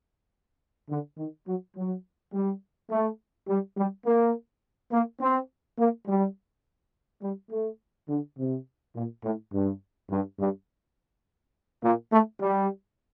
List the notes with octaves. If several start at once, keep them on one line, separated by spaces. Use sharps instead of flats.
D3
D#3
F#3
F#3
G3
A3
G3
G3
A#3
A#3
C4
A#3
G3
G3
A3
D3
C3
A#2
A2
G2
G2
G2
A#2
A3
G3